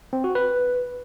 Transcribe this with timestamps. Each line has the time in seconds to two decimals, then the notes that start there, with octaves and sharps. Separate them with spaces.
0.13 C4
0.24 F#4
0.35 B4